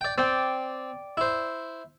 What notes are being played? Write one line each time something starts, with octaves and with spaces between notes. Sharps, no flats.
D5 G5
C4 D5 G5
E4 C5